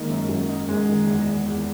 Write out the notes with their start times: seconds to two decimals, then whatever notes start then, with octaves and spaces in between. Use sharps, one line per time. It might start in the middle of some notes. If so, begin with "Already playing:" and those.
Already playing: D#3 G#3 A#3 C#4 D#4
0.10 F#2
0.29 F#2 F#3
0.49 D#4
0.68 F#2 G#3
0.87 D#3
1.07 E2
1.27 E2
1.46 E2